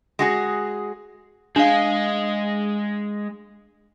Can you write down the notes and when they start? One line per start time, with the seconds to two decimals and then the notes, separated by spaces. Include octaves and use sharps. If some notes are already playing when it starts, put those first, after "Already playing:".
0.19 G#3 F#4 G#4
1.56 G#3 D4 F5